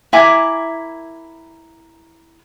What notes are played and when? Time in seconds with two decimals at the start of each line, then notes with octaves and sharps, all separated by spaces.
0.13 E4 A#4 G#5 D6